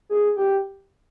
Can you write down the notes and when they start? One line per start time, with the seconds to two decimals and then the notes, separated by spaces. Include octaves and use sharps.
0.09 G#4
0.36 G4